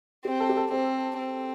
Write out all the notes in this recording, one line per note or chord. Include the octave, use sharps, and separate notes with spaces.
C4 G4
A4
G4
A4
C4 C5
C4